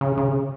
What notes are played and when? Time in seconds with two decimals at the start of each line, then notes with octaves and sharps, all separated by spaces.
0.01 C#3
0.17 C#3